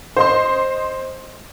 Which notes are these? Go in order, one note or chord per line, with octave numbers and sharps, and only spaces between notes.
C5 D#5 C6